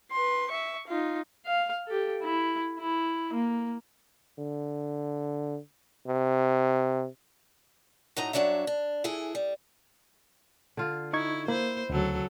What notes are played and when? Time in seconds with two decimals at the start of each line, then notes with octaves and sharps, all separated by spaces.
0.11 B4 C6
0.51 E5 C#6
0.87 D#4 F4
1.46 F5
1.86 G4 A4
2.22 E4
2.79 E4
3.33 A#3
4.39 D3
6.07 C3
8.16 A2 F#3 D#4 A#5
8.33 G2 E3 F#3 D4 C#5 E5
8.67 D4
9.04 E3 E4 G#4 A4
9.35 G3
10.77 D3 F4
11.13 D#4 E4 C#6 G#6
11.48 A#3 E4 C5
11.90 D2 C#3 F#3 A4